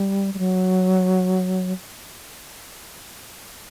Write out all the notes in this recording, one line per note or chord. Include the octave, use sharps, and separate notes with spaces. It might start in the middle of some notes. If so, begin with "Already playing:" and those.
Already playing: G3
G3
F#3